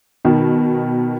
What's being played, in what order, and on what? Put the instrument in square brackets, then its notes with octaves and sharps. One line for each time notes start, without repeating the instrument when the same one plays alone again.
[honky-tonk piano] B2 D#3